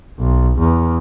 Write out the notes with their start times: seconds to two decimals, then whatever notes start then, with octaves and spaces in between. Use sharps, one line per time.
0.20 B1
0.59 E2